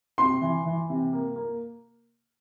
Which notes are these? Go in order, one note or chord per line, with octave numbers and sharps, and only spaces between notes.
C3 C6
E3
E3
C3
A#3
A#3